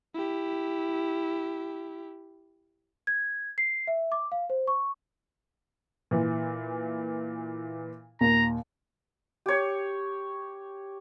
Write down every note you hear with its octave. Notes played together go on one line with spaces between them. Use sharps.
E4 G4
G#6
C7
E5
D6
F5
C5
C#6
A#2 E3
D#2 A#2 A#5
G4 C#5